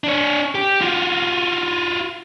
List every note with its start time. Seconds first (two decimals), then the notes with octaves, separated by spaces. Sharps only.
0.04 D4 C#5
0.55 G4
0.81 F4 F#4